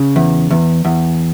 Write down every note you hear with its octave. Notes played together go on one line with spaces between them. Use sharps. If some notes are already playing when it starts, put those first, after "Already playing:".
Already playing: C#3
E2
E2
E2